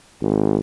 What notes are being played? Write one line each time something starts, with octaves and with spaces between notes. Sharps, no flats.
G#1